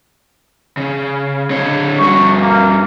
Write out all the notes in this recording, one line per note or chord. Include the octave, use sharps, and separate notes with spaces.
C#3
D3 C#5
G2 F#4 C#6
A#3